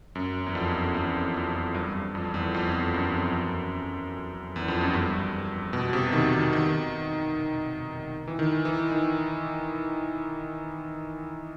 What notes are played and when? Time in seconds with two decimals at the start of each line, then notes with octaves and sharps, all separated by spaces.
0.15 F#2
0.46 E2
0.55 F2
0.94 E2
1.34 F2
1.74 G2
1.94 G2
2.15 F2
2.34 E2
2.54 F2
2.94 F#2
4.56 E2
4.68 F2
4.81 F#2
4.93 G2
5.73 B2
5.93 C3
6.13 D#3
6.33 D#3
6.53 D#3
8.27 E3
8.39 D#3
8.65 E3
8.92 D#3